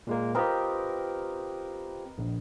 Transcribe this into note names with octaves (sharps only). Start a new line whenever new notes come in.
A#2 G#3 A#3
C4 F4 G4 A#4 B4 D#5
A#1